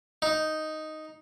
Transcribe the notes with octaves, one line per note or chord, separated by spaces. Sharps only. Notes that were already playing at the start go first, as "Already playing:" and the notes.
D#4